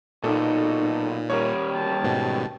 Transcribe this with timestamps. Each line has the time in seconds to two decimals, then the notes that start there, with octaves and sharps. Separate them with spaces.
0.24 B1 A#2 D#4 A4
1.30 D#2 G3 A#4 C#5
1.71 G5 A5
2.04 G#2 B2